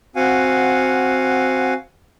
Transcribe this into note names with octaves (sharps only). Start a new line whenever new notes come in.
C4 F#4 F5 F#5 G#5